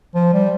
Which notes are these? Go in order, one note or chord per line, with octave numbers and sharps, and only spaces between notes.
F3
G3